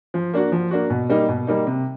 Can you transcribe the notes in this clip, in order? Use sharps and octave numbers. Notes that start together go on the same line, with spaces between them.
F3
A#3 D4 F#4
F3
A#3 D4 F#4
B2
G3 A#3 D#4
B2
G3 A#3 D#4
C3